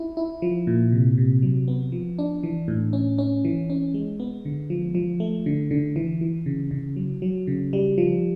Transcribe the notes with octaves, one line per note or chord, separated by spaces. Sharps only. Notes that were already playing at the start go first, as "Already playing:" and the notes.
Already playing: E4
E4
F3
A#2
C3
C3
F#3
B3
F3
D4
E3
A2
C#4
C#4
E3
C#4
G#3
B3
D3
F3
F3
A3
D3
D3
E3
E3
C#3
C#3
F#3
F#3
C#3
G3
F3